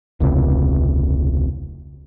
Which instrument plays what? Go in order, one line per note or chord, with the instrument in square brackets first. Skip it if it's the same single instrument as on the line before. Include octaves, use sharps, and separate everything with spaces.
[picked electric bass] E1 C#2 C3